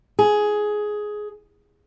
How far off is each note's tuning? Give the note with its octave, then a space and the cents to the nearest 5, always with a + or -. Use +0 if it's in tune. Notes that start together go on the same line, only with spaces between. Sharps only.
G#4 +10